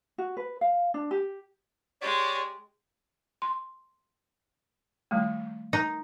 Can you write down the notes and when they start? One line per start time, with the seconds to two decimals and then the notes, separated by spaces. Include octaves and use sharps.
0.18 F#4
0.37 B4
0.61 F5
0.94 D4
1.11 G4
2.01 G#3 G4 C#5 D5
3.42 C6
5.11 D#3 G3 A3
5.73 D#4